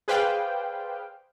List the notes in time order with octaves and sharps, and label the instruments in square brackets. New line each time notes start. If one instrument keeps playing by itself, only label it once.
[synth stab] G#4 B4 C5 D5 F5 G5